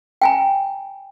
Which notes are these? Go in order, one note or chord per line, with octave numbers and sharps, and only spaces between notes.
G5 G#5 A#5